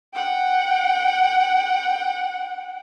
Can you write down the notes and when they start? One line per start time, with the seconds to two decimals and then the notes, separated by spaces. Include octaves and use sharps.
0.14 F#5 G5